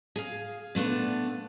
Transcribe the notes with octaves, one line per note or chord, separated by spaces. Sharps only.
G#4 F5
A#2 A3 B3 D4